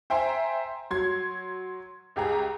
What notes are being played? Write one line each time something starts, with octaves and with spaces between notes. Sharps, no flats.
C5 E5 G5 G#5 A#5 C6
F#3 C6 G#6
C#2 G4 G#4 A#5